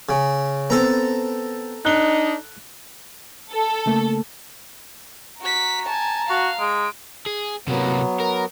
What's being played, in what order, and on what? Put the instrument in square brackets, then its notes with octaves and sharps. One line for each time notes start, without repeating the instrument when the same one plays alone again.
[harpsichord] C#3
[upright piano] B3 C4 [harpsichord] A4 A#5
[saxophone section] D4 D#4 [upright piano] F#6 G7
[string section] A4
[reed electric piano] C#3 A3 A#3
[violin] F#4 B6 [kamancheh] A#5
[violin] G#5 A5
[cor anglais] F#4 [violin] F5
[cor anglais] G#3 [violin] D7
[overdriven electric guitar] G#4
[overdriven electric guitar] C3 A#3 [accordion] F#3 B3
[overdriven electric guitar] A#4